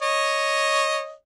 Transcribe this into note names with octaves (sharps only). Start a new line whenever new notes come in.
C#5 D#5